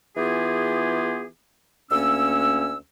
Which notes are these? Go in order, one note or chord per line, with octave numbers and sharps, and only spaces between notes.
E3 B3 F4 G4 G#4
D2 A#3 C#4 E6